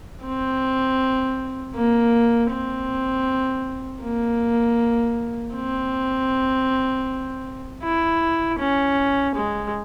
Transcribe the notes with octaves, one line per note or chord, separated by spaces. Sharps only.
C4
A#3
C4
A#3
C4
E4
C#4
G#3